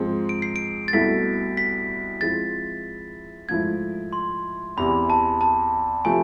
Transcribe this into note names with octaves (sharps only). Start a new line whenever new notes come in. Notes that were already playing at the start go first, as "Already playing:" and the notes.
Already playing: G#2 F3 G#3 C4
D7
C7
D7
A6
C2 B2 A3 E4 A4 B6
B6
F3 G#3 C4 E4 A6
G#2 F3 A3 E4 G#6
C6
E2 C3 E3 B5
A5
A5
C3 F3 A3 G#5